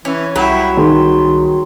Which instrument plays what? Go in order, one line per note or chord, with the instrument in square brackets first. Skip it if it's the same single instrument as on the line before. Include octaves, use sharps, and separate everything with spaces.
[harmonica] E3 [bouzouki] C#4
[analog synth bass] C2 [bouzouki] F#3 [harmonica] E4 F#4 G4
[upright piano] D#3 G#4 [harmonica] C6